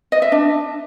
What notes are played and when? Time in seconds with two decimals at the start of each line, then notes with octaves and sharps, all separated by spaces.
0.12 D#5
0.22 E5
0.32 D4